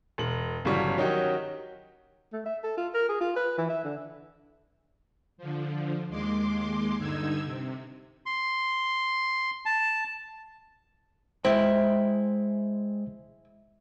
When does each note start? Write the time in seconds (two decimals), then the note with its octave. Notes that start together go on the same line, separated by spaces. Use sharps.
0.18 E1 F#7
0.65 G1 C#3 E3 F#3 G3 C#6
0.97 D#3 F#3 C#4 D#4 F#4 G4
2.33 A3
2.46 E5
2.64 A4
2.77 F4
2.94 A#4
3.09 G#4
3.21 F4
3.36 B4
3.58 E3
3.70 E5
3.84 D3
5.38 D3 F3
6.09 D#2 G#3 C6 D6
6.98 G2 D3 D#4 E6 G#6
7.44 C3
8.26 C6
9.66 A5
11.45 G#3 E4 C5 G5